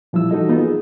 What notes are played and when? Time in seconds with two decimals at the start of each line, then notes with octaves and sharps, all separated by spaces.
0.13 A#2 F3 G3 E4 E6
0.31 E3 D#4 F#4 A4 D#5
0.49 A#3 B3 D#4 F4
0.61 G#4